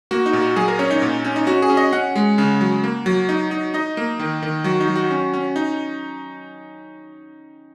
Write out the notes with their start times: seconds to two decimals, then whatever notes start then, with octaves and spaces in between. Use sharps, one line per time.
0.11 A#3 F#4
0.26 D#4
0.33 A#2
0.41 F#4
0.56 F#3 G#4
0.68 A#4
0.79 C#4 C#5
0.91 D#4
1.02 A#2
1.25 C#4
1.36 D#4
1.47 C#4 F#4
1.62 G#4
1.70 C#4
1.77 D#5
1.93 C#4 F#5
2.16 G#3
2.38 C#3
2.61 F#3
2.84 A#3
3.06 F#3
3.29 D#4
3.51 D#4
3.74 D#4 D#5
3.97 A#3
4.19 D#3
4.43 D#3
4.64 F#3 F#4
4.80 D#4
4.88 F#3
4.95 F#4
5.11 C#4
5.34 C#4
5.56 D#4